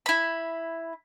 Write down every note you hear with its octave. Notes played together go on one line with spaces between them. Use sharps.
E4 B5